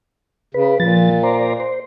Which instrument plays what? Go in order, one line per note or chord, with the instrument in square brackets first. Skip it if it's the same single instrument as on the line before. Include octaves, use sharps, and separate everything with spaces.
[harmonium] C#3 [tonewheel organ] B4
[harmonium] A#2 [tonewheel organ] F3 A6
[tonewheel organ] C5 D5 A#5
C5